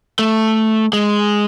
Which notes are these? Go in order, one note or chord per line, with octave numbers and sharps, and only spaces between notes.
A3
G#3